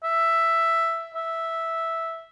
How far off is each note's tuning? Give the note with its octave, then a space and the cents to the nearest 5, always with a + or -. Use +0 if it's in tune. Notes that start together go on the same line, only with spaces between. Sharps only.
E5 +5
E5 -5